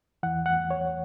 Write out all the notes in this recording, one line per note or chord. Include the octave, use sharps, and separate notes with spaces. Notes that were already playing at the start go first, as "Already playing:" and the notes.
E2 E3 F#5
F#5
C#5